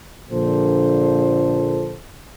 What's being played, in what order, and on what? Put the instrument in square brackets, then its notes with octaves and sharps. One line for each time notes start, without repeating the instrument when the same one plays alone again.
[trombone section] A#1 A#2 D3 F3 A4 C5